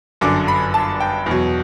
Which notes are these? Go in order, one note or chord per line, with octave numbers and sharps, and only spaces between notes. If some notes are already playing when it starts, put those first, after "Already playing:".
G1 F#2 D3 D6
B5
A5
G5
E2 B2 F#3